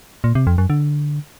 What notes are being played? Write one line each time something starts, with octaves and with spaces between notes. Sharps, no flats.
A#2
C3
F2
F#2
D3